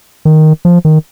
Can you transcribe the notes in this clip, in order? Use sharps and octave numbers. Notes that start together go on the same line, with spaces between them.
D#3
F3
D#3